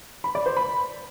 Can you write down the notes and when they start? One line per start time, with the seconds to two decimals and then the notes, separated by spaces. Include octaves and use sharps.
0.24 B5
0.35 D5
0.46 C5
0.57 B5